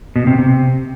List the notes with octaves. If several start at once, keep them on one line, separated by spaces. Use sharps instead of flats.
B2
C3
C3